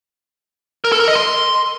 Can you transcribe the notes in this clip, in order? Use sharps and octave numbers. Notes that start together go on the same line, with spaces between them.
A#4
A4
A#4
D#5
C6